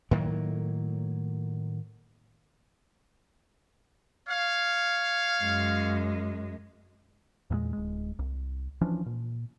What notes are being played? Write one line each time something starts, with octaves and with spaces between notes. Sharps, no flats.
A2 D#3 F#3 A#3
C#5 F5
F#2 G#3
E2 G2 A#2 G#3
D1 G#3
C2
E3 F3 C#4 D4
A#2